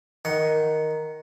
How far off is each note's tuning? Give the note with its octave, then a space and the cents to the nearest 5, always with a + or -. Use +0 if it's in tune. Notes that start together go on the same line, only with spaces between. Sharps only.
D#3 +0 F#5 +0